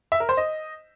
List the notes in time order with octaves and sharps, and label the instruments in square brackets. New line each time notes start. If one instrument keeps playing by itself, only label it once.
[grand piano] E5
A#4
C5
D#5